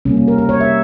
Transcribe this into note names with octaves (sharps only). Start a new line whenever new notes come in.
C3 G3 A#3 C#4
C#4
A#4
A#4
C#5
E5